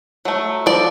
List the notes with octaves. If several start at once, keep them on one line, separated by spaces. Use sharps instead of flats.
F#3 A3
F3 D5